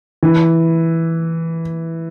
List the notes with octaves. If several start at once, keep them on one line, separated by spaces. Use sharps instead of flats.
E3